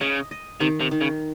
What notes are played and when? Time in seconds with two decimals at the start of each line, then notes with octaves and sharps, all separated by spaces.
0.01 C#3 D#5
0.31 D#5
0.60 C3 D#3
0.81 C3
0.91 D#3
1.01 C#3